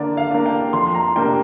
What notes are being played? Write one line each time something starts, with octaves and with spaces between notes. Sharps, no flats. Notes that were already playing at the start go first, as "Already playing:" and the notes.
Already playing: D3 A#3 D5
F5
A#3 D4
G5
F2 C6
A#5
C3 A#3 D4 G5